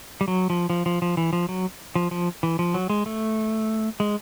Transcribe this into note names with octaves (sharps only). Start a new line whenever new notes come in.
G3
F#3
F3
F3
F3
F3
E3
F3
F#3
F3
F3
E3
F3
F#3
G#3
A3
G#3